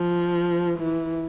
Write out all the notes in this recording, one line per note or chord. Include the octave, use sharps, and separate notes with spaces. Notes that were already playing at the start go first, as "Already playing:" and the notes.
Already playing: F3
E3